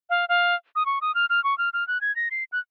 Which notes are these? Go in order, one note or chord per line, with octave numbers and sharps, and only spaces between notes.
F5
F5
D#6
C#6
D#6
F6
F6
C#6
F6
F6
F#6
G#6
A#6
C7
F#6